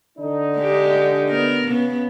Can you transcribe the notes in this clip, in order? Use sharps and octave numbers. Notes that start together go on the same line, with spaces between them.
D3 D4 D#4
G#3 G4
B3 A#4
C#3 B3